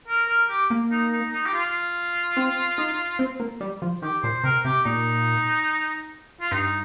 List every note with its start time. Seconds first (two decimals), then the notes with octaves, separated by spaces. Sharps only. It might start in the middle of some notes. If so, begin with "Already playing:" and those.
0.08 A#4
0.28 A#4
0.49 G4
0.70 A#3
0.91 D#4
1.12 D#4
1.33 D#4
1.46 G4
1.53 F4
2.37 C4
2.78 D#4
3.19 C4
3.40 A#3
3.61 G3
3.82 F3
4.02 D#3 G4
4.23 A#2 C5
4.44 C3 A#4
4.65 C3 G4
4.85 A#2 D#4
6.40 F4
6.52 G2 D#4